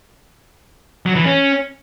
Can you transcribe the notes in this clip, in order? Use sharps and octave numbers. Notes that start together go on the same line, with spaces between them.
F#3
E3
C#4